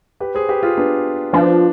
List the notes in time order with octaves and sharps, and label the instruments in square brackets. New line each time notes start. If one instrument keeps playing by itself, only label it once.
[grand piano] G4 B4
G#4 C5
G4 B4
F4 G#4
B3 D4
[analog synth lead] F3 [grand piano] B3 D4